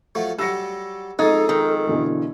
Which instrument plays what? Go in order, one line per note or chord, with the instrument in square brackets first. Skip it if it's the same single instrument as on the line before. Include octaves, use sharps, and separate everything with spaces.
[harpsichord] F3 F#3 A3
[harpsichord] F#3 G3 [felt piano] E6 A#6 C#7
[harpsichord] F2 G#3 [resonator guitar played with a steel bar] D#4 [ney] A4 [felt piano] G#6 A6
[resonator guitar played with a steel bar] D#3 [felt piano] A#5
[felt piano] B2 D3 E3